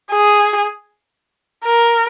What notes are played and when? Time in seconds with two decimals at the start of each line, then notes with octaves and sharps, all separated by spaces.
0.12 G#4
1.64 A#4